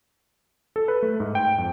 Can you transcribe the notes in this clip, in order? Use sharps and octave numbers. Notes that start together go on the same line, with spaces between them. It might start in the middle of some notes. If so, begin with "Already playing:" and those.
A4
B4
A3
G#2
G5
F2